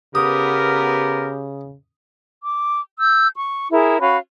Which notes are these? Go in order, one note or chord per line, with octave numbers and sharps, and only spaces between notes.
C#3 B3 G4 A#4 D#6
D6
E6 G6
C#6
E4 G#4 A#4
C#4 F#4 F5 B5